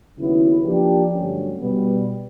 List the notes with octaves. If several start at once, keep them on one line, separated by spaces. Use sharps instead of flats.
D#2 C#3 F#3 B3 E4
F3 A#3 D4 G4
G2 D3 F#3 A3 C#4
B2 G3 B3